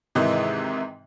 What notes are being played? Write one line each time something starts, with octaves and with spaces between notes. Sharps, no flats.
G#2 C3 D#3 E3 G#3 D#4